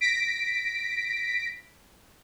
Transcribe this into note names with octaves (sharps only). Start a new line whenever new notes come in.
A#6 B6 D7